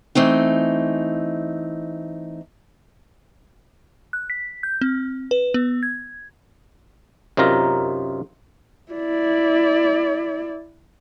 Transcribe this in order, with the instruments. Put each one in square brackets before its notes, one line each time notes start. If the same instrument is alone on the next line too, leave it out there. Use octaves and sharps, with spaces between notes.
[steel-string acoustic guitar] E3 A3 C4 D#4
[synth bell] F#6
B6
G6
C4
B4
B3
G#6
[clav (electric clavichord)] F#2 C3 D#4 F4 A#4 A#5
[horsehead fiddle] E4 D5